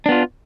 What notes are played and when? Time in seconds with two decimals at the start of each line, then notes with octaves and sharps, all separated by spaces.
0.06 D4
0.09 B3
0.12 F4